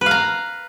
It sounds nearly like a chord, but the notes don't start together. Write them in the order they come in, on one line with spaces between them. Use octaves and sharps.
B4 F5 A#5